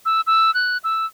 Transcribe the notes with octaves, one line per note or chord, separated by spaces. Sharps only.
E6
E6
F#6
E6